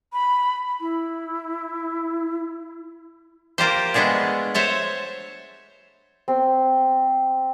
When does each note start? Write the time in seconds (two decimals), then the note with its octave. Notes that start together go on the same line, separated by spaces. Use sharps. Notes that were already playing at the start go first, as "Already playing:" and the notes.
0.13 B5
0.81 E4
3.58 A#3 F4 G4 C5
3.94 G#3 A3 B3 D4 G#4
4.54 C5 C#5 E5 A5
6.28 C4